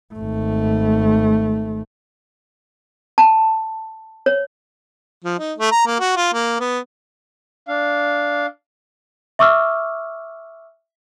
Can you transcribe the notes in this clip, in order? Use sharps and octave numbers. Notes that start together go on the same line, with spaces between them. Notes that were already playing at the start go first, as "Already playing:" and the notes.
G#1 A3
A5
C#5
F3
D#4
A3
A#5
A#3
F#4
F4
A#3
B3
D4 F5
E5 C#6 D6 E6 F6